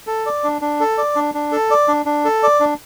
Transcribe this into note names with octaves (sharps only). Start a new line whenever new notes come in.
A4
D5
D4
D4
A4
D5
D4
D4
A4
D5
D4
D4
A4
D5
D4